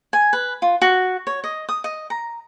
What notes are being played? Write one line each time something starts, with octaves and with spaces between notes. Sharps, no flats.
G#5
B4
F4
F#4
C#5
D#5
D#6
D#5
A#5